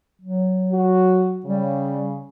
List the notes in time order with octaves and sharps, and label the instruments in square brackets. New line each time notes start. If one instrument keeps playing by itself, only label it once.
[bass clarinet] F#3
[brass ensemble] F#4
[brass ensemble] C#3 [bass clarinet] G3